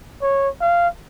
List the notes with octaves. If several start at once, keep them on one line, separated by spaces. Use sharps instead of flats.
C#5
F5